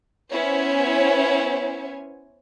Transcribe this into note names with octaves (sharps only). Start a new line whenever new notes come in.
B3 C#4 E4 C5 C#5 G#5